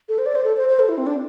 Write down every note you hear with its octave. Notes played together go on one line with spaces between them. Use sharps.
A4
C5
D5
C5
A4
C5
C5
A4
E4
C4
D4